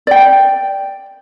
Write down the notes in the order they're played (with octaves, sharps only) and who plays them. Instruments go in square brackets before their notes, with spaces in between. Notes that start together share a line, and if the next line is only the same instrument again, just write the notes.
[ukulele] D5 G5